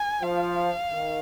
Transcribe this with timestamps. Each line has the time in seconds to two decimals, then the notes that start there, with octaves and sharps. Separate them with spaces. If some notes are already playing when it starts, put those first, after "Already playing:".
Already playing: G#5
0.23 F3 F5
0.91 D#3